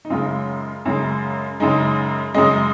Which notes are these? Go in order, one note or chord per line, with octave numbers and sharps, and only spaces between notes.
D#4
F#2 C#3 G#3 F4
F#2 C#3 G#3
F#2 C#3 G#3 D#4
F#2 C#3 G#3 D#5